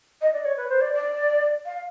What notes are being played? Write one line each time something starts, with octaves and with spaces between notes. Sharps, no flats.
D#5
D5
C#5
B4
C5
D5
D5
F5